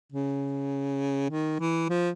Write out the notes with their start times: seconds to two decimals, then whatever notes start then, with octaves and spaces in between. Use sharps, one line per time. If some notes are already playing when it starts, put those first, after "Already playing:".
0.12 C#3
1.30 D#3
1.60 E3
1.89 F3